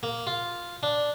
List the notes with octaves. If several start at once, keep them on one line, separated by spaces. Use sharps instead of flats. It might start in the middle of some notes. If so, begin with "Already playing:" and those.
A#3
F4
D4